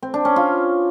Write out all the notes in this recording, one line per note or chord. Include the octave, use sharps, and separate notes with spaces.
C4
D4
C#4
F4